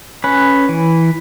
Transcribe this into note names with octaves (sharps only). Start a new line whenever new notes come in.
C#4 B4
E3